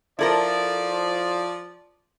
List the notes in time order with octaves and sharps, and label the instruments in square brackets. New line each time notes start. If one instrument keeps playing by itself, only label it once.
[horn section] F3 D5 [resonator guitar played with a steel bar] E4 A4 A#4